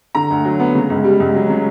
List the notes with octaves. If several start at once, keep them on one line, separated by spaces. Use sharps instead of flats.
D3 A#5
D2
F#3
B3
C#3
C#2
G3
C#2
F#3
C#3